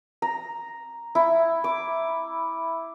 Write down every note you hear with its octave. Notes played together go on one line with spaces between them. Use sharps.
A#5
E4
D6